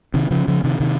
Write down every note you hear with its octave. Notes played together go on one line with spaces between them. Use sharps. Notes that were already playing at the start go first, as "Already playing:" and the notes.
C3 D#3
C#3 F3
C#3 F3
C3 D#3
C3 D#3